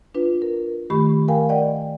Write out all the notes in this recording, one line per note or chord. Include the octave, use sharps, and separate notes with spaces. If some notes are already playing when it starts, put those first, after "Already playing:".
D4 F4 B4
A#4
D#3 A3 G4 B5 C#6
A#4 F5 G5 G#5
D5 D#5 F#5 G5